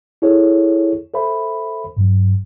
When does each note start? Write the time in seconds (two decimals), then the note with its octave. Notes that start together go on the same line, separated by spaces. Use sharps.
0.22 E4 G#4 A4 C#5
1.14 A4 C5 E5 B5
1.97 G2 F#3